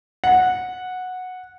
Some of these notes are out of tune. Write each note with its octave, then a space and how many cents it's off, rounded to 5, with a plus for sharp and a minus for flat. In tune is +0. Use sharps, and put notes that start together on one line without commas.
F#5 -10